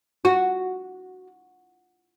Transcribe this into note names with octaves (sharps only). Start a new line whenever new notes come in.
F#4